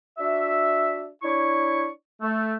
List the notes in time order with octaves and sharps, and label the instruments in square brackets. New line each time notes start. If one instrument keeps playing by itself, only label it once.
[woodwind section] D4 F#4 E5
D4 E4 C#5 C#6
A3